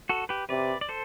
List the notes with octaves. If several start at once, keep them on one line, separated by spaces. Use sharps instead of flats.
F#4 A4
G4 B4
C3 B4 D5
D5
A4 C5